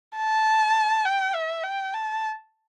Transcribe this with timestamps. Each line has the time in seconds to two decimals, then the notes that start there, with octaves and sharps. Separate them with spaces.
0.17 A5
1.06 G5
1.35 E5
1.64 G5
1.94 A5